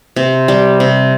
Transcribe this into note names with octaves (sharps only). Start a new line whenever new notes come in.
C3
G3
C3